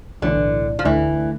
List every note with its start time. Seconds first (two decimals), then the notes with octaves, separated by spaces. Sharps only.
0.22 B1 A2 D3 E3
0.79 F3
0.85 D2 D3 E3 A3 D4